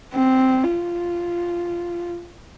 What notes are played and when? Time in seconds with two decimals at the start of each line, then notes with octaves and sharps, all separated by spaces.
0.14 C4
0.64 F4